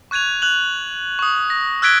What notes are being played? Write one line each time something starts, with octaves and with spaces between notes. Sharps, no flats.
C#6 F#6 G#6 D#7 F7
F#6 F7 F#7
C#6 D#6
A#6
E6 F#6 G#6 B6 D7 G7